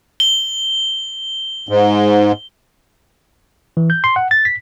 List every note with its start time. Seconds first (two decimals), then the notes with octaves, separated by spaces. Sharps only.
0.20 G7
1.69 G#2
3.77 E3
3.90 G6
4.04 C6
4.16 F#5
4.31 A6
4.45 B6